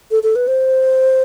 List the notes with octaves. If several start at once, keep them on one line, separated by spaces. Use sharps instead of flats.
A4
A4
B4
C5